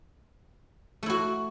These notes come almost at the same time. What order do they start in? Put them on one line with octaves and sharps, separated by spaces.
A3 E4 F#4